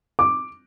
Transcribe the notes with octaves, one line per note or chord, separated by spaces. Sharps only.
D6